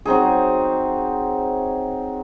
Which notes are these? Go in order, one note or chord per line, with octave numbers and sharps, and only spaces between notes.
F#3 C4 D#4 G#4